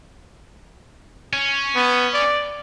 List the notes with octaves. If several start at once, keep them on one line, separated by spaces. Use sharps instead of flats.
C#4
B3
D5